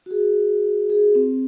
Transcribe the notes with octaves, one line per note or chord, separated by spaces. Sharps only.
F#4
G#4
G#4
C4